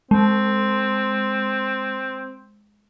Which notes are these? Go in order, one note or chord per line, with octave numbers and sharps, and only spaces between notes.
G#3 C4